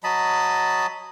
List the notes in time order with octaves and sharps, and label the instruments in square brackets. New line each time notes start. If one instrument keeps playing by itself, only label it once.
[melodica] F#3 D#5 A5 B5